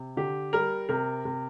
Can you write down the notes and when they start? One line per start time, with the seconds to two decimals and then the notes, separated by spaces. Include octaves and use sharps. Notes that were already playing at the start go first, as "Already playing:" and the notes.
Already playing: C3
0.17 D3 G4
0.53 G3 A#4
0.89 C3 A#4
1.25 C3